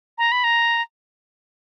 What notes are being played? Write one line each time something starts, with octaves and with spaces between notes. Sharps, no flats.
A#5
B5
A#5